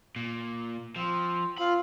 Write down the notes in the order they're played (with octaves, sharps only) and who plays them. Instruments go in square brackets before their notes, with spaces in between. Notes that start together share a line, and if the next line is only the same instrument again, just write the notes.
[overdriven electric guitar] A#2
[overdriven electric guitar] F3 [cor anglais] C4
[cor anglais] C4 [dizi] F4 [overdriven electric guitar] B5